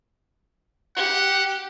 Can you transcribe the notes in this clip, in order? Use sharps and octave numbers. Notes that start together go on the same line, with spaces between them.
G4 F#5